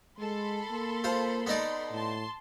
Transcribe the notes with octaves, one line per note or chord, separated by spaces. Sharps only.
G#3 A4 B5 C6
A#3
F4 C5
B3 D#4 D5
A2 A5 C6